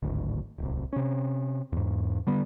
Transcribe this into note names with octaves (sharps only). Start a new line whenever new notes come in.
D1 G#1 D2
D1 C2
C3 C#4
E2 G#2
D3 G3 B3